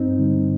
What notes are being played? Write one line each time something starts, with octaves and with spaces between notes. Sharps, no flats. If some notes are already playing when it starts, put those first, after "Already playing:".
Already playing: G2 C4 D#4
D3 G3